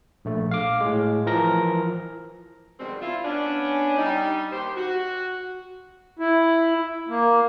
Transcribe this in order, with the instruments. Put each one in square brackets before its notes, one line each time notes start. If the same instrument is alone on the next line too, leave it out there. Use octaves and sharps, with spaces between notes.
[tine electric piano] A#1 A3
F5 D6
A2 G#3
E3 F3 A#4 A#6
[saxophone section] F#2 B2 D#3 G3 G#3 C4
E4 F4
B3 C#4 D4
G3 D#4
D#2 G4 C5
F#4
[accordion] E4
A#3